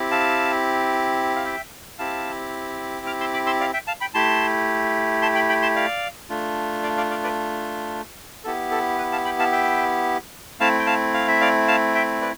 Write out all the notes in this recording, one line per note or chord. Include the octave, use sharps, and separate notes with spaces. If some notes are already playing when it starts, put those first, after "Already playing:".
Already playing: C4 E4 G4
F5 A5
F5
E5 G5
C4 E4 G4 F5 A5
D6 F6
C6 E6
B5 D6
C6 E6
D5 F5
E5 G5
F5 A5
G5 B5
A3 E4 G4 A5 C6
A5 C6
G5 B5
G5 B5
A5 C6
D5 F5
A3 D4 F4
D5 F5
D5 F5
D5 F5
B4 D5
B3 E4 G4 A4
A4
B4
F5 A5
G5 B5
F5 A5
E5 G5
A3 C4 E4 F5 A5
G5
F5 A5
F5
E5
D5 F5
F5 A5
E5 G5
B4 D5